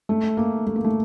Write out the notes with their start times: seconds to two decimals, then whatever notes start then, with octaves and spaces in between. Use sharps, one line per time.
0.09 A3
0.37 A#3
0.67 A3
0.76 A#3
0.84 A3